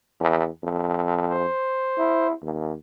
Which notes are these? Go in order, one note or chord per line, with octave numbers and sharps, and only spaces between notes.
E2
F2
C5
E4
D#2